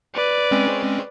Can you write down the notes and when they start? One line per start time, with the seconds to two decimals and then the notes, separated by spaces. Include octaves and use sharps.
0.14 B4 D5
0.51 G#3 C4 C#4